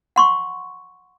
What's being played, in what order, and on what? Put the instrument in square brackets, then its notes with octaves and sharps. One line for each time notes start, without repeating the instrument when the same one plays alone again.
[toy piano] F#5 C6 C#6